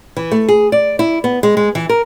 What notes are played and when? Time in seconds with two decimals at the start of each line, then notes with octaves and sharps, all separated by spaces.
0.17 E3
0.31 A3
0.49 G#4
0.72 D5
0.99 E4
1.24 B3
1.43 G#3
1.57 G#3
1.75 E3
1.89 A#4